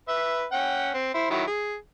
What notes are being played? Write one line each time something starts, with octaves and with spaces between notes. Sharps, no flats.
B4 E5
C#4 F#5 G5
C4
E4 C5
D#3 F#3 E4
G#4